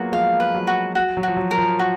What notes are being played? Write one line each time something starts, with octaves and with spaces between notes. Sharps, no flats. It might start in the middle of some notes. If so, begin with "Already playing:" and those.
Already playing: F#3 A#3 B3 F4 F#4 G#4
F3 G#3 F5
B4
F#3
F#4
F#4
F#3
F3 F#4
F#3
A#4
F3
F#4